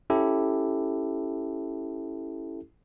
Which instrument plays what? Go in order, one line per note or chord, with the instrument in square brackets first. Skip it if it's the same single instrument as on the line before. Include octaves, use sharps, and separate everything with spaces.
[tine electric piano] C#4 E4 G4 A4